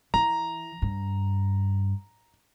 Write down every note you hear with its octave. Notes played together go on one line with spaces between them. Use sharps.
E3 A#5
G2